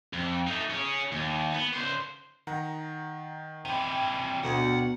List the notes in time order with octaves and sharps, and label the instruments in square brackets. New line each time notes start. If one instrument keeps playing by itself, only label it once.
[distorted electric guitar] F2
A3 D#4
C#4 G#4
D#2
B3
C#2 C5
[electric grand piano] D#3 F#5 A#5
[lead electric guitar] C3 E3 [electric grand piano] G5
[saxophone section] D2 [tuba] B2 [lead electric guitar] F#5